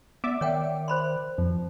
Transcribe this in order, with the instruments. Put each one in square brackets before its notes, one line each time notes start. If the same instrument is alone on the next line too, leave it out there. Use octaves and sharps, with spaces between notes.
[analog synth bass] B3 [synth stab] D5 E5 D6
[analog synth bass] D#3 [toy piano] C#5 F#5 G5
[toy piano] C5 B5 C6
[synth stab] F2 [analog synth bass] F3